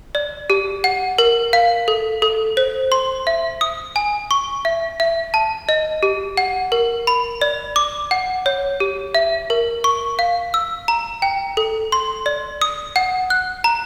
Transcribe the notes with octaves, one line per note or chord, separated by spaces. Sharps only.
D5
G4
F#5
A#4
F5
A4
A4
C5
C6
E5
D#6
G#5
C#6
E5
E5
A5
D#5
G4
F#5
A#4
B5
D5
D6
F#5
C#5
G4
E5
A#4
C#6
F5
E6
A#5
G5
A4
C6
D5
D#6
F#5
F#6
A#5